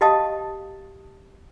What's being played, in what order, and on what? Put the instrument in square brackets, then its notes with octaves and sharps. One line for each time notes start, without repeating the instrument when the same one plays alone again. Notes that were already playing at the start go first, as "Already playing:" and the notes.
[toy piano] F#4 G4 D#5 F5 A5 D#6